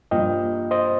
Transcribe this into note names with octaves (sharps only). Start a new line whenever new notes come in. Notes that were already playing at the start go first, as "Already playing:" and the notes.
G2 F3 A#3 D#5 G5
C5 D#5